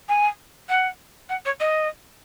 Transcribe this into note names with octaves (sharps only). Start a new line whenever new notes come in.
G#5
F#5
F#5
C#5
D#5